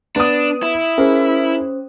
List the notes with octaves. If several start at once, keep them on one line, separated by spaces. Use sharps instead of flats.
B3 D4 D#6
E4
C#4 G#4 A#4 C5